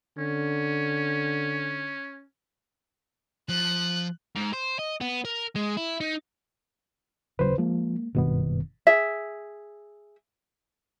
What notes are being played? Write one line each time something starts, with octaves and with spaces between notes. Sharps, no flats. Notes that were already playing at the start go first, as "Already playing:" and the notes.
D3 C#4
F3 F#6
G#2
C5
D#5
B3
A#4
G#3
E4
D#4
D#1 C#3 F#3 B4 C5
F3 G#3 A#3
F#1 G2 B2 D#3 B3
G#4 E5